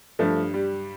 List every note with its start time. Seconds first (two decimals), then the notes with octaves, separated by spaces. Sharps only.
0.19 G2 F3 A3
0.54 G3